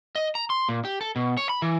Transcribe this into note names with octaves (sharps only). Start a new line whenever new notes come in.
D#5
A#5
C6
A#2
G4
A4
B2
C#5
B5
E3